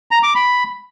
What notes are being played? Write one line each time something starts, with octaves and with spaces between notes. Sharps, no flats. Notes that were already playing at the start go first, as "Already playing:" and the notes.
A#5
D6
B5